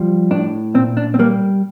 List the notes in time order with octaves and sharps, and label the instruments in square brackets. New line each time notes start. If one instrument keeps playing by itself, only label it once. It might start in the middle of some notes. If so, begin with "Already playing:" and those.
Already playing: [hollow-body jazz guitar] F3 G3
A2 D4
A#2 C4
D4
C4
G3 A#3